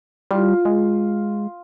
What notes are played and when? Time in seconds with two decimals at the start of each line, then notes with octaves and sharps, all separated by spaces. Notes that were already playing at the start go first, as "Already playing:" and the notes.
0.31 G3 F4
0.65 G#3